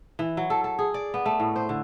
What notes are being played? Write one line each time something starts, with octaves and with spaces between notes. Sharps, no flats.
E3
F#3
A4
A4
G#4
D5
B3
A3
A2
C5
D3